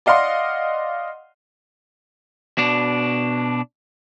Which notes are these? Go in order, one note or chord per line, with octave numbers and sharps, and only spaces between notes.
D5 D#5 F5 F#5 C6
B2 D4